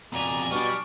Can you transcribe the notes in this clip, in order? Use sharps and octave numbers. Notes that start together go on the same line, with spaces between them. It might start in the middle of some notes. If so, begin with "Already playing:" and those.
F2 B2 D5 G#5 A#5
B2 G3 D4 C#6 F6